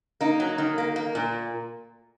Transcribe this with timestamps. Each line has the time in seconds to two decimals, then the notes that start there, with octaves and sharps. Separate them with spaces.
0.21 A#3 D#4
0.40 F#3
0.58 D#3
0.78 A#3
0.96 A#3
1.15 A#2